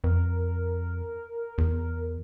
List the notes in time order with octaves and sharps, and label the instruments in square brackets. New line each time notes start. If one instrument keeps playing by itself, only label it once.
[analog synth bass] F2 [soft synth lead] A#4
[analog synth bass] E2